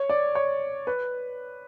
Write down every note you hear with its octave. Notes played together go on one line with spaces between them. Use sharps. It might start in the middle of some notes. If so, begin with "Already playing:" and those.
Already playing: C#5
D5
C#5
B4